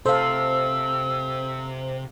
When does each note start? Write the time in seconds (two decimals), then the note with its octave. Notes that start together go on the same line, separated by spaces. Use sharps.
0.06 C3 A4 C5 F5 E6